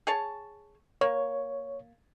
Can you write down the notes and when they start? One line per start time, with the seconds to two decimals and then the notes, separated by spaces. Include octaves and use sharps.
0.07 G#4 C#5 A5
1.01 A#3 C#5